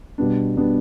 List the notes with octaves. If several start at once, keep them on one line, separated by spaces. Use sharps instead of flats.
B2 G3 B3 D4
B2 G3 B3 D4